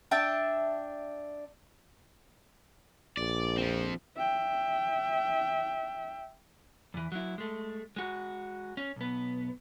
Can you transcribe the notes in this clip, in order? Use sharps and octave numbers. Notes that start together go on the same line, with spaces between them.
D4 E5 G5 A5
A#1 D5
F3 C4
E5 G5
E2 E3
F#3 E4
G#3 A3
G#3 F#4
C#4
B1 B3